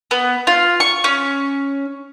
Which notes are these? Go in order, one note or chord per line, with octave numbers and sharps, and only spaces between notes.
B3
F4
C#6
C#4